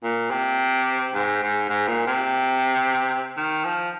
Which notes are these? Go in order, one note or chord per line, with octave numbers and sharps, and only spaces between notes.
A#2
C3
G#2
G#2
G#2
A#2
C3
D#3
F3